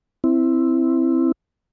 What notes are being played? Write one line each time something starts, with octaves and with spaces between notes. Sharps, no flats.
C4 E4